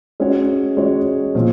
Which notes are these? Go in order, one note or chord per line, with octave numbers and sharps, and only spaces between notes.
G#3 C#4 F#4 C#5
G#3 C#4 F#4 C#5
A#2 F3 C4 F4 C5